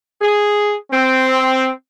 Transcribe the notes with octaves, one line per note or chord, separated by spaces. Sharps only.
G#4
C4